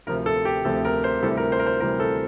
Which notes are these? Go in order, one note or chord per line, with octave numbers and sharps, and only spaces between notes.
D2 C3 F3 A#4
A4
G4
D2 C3 F3 A4
A#4
C5
D2 C3 E3 G3 A4
A#4
C5
A#4
C5
D2 C3 E3 G3 A#4
A4